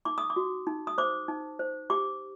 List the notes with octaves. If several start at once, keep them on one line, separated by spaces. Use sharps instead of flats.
D#4 D6
D#6
D6
F#4
D#4
D#6
C5 D6
D#4
C5
G4 D6